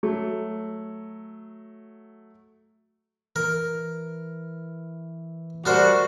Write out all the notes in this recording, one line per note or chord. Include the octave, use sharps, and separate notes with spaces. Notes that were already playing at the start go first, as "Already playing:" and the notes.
F#3 A3
E3 A#4
G3 A3 D4 F#4 A#4 C5